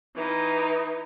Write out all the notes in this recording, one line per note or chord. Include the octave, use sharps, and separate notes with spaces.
E3 D#4